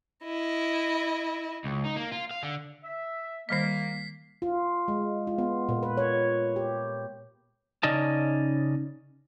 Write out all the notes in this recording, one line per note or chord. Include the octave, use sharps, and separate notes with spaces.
E4 D#5
C#2
D#4
A#3
F4
F5
D3
E5
D#3 G3 A#3 D#5 B6 C7
F4
G#3
F4
B3
A#2
B4
C#5
G4
C#3 C#4 D#4 D5 D#5 A5